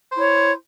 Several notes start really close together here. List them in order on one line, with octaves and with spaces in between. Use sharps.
C5 E4 C#5